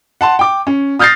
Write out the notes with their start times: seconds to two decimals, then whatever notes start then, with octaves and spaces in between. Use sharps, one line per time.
0.21 F#5 A5 C6
0.39 G5 D6
0.67 C#4
0.99 D#6 F6 G6 A6 A#6 C7